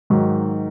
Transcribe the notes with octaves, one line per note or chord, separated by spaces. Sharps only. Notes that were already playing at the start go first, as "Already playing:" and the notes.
G#2 D#3 F#3